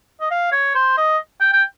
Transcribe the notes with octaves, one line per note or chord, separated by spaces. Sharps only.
D#5
F5
C#5
C5
D#5
G5
G5